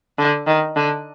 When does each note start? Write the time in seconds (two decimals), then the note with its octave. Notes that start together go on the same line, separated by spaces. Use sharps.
0.18 D3
0.47 D#3
0.76 D3